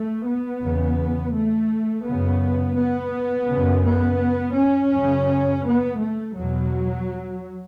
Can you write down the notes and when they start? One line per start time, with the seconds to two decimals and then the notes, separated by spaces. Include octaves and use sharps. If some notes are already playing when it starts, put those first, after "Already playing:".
Already playing: A3
0.26 B3
0.62 E2 C#3
1.34 A3
2.05 F#2 C#3 B3
2.77 B3
3.48 F#2 C#3
3.85 B3
4.56 C#4
4.93 F#2 C#3
5.64 B3
5.99 A3
6.35 E2 B2 F#3